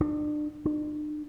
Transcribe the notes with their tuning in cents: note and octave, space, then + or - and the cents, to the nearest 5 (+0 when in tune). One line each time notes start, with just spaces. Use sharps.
D4 +35
D4 +45